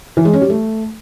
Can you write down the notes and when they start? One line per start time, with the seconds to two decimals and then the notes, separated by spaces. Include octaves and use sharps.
0.17 E3
0.25 G#3
0.33 C#4
0.42 G3
0.50 A3